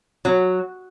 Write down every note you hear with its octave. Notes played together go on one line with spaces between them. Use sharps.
F#3